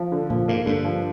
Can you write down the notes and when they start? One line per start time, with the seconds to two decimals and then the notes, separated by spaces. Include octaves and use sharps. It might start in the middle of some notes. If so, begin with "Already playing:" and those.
Already playing: F3
0.12 D3
0.30 A#2 F3
0.48 G#2 A#3
0.66 G2 D3
0.85 F3